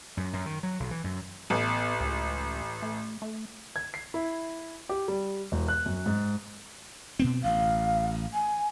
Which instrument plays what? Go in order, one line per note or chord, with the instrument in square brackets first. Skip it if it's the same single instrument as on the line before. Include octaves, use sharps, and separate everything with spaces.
[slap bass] F#2
F#2
D#3
F#3
B1
E3
F#2
[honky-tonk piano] A1 [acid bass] B3
[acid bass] C#2
A3
A3
[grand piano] G#6
C7
E4
G4
G3
E1
F#6
F#2
G#2
[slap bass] B2 B3 C4
[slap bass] A1 [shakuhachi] F5
[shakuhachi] G#5